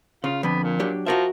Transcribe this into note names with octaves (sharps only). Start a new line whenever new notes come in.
C#3 F4
F2 D3 B3
A#2
F#3 D4 G4
F3 F#4 A#4 E5